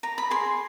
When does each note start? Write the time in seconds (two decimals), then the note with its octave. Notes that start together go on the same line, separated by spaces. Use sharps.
0.03 A#5
0.18 B5
0.31 G#4 C6